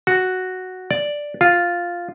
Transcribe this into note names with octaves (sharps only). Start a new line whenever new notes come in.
F#4
D5
F4